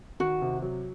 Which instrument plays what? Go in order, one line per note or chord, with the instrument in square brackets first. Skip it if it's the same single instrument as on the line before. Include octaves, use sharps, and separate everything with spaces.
[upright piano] D#3 [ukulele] F#4
[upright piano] C3
F#3